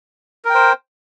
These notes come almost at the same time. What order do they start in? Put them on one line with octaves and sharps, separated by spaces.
A#4 G5 C5